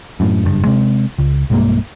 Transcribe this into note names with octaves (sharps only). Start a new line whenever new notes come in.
F#2 A2
F#1 G2
C3 G#3
C#2
B1 G2 G#3 A#3